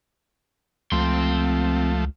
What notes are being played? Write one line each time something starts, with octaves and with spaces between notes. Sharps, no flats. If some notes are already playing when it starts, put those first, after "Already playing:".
C#2 F3 A3 C4 C6